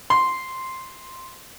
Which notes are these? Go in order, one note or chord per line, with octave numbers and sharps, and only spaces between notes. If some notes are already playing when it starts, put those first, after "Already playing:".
C6